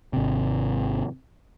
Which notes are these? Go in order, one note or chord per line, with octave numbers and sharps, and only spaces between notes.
G#1 C3